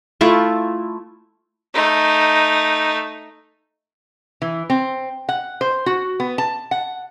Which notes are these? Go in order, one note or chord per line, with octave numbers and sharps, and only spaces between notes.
A3 E4 F4
A3 D#4
E3
C4
F#5
C5
F#4
B3
A5
F#5